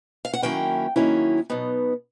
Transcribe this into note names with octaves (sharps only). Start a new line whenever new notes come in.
F5
F#5
D#3 F#3 A#3 C#4 E4 G5
D#3 F#3 A#3 C#4 E4
B2 F#3 B3 D#4